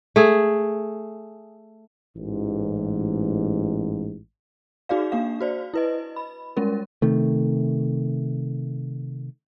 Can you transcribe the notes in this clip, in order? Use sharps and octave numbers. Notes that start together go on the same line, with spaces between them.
A3 G#4
A1 G#2
D#4 F#4 G#4 D5 F5
A#3 D4 F5
F#4 C5 D5
E4 B4 D#5
B5
G3 G#3 C#4 A#4
C3 D#3 A3